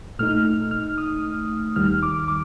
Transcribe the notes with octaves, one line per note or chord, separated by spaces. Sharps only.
A#2 A3 D#4 F6
F6
F6
D#6
D#2 D#3 G3 F6
D6
D6